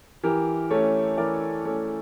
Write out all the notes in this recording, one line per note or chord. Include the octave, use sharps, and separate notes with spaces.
E3 G4 A#4
A3 C#4 A4 C#5
E3 A#4 D5
A3 C#4 A4 C#5